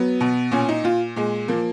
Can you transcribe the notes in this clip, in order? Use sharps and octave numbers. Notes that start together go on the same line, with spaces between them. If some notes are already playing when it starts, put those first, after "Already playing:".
Already playing: F#3 B3
B2
A#2 C#4
D#4
A#2 F4
A#2 G#3
F3 A#3